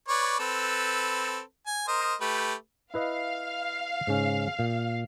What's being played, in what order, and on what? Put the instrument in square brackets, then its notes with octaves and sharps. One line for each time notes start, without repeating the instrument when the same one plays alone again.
[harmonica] B4 C#5 D5
C4 A4 B4
G#5
A#4 C5 D#5
A3 G4 B4
[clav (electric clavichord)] E4 B4 D#5 [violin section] F5
[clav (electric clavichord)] G#2 C#3 C#4
A#2